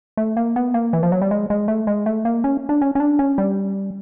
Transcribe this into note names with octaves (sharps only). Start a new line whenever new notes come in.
A3
A#3
B3
A#3
E3
F3
F#3
G3
G#3
G#3
A3
G#3
A3
A#3
C#4
D4
C#4
C#4
D4
C#4
G3